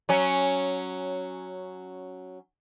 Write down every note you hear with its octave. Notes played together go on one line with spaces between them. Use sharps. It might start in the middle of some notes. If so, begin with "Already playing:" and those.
F#3 C#4